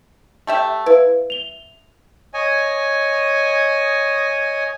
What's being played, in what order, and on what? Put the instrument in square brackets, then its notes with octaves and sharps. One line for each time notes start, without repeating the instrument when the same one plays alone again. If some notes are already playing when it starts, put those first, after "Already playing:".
[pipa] A3 G4 E5
[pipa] E4 [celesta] B4 F5
[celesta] F7 G7
[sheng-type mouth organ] C#5 D#5 G#5